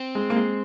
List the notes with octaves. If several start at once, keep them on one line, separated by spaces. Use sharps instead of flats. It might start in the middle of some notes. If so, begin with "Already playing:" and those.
Already playing: C4
G#3
A#3
G#3